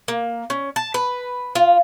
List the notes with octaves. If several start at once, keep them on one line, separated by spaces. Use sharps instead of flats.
A#3
C#4
A5
B4
F4